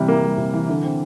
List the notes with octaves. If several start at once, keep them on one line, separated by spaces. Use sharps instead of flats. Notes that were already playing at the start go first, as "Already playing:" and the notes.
Already playing: C3 E3 G3
A#3
G3
C3
E3
D3
C4